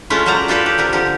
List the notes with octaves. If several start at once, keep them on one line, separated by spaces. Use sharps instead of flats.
G#3 A3 C#4 E4 F4
A#2 F#3 C5 D5 A#5
D4 F4 G4 A4 B4 D5
G4
C3 G3 A#4
D3 F3 G4